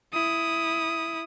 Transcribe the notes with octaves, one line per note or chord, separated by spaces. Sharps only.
E4 D#6